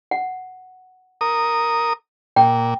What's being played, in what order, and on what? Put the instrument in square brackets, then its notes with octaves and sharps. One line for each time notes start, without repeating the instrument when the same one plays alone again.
[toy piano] F#5
[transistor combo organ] A#4 D#6
[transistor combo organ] A#2 [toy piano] G5